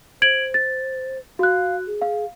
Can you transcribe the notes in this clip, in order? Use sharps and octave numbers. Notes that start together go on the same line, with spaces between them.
C5 G#6 D7 F#7
A6
F#4 F5 F#6
G#4
F5